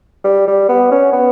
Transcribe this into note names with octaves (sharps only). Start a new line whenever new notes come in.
G3
G3
B3
C#4
B3